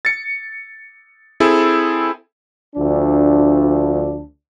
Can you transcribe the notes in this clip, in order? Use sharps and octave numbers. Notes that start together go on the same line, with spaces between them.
A6 C#7
C4 E4 G#4 A4
D2 F3 D4